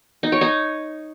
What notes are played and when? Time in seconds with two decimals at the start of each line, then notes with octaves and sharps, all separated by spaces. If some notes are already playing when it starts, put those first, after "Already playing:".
0.23 D#4
0.32 C#5
0.41 D#4